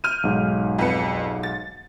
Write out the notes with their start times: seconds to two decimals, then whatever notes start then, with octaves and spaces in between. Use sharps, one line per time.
0.04 F6 G6 D#7
0.23 B1 G#2
0.79 F2 B4 C#7
1.43 A6